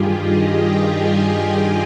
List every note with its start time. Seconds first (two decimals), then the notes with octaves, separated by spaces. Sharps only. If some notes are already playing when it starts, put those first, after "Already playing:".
Already playing: G2 D#3 G3 F4 G4 G#4
0.19 D#5
0.55 G5
0.93 G#5
1.30 G#5